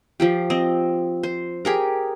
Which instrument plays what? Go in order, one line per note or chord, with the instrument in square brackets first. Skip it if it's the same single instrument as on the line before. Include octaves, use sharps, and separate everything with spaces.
[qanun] F3 F4 G4
C4 D#5
C5
G4 G#4 A#4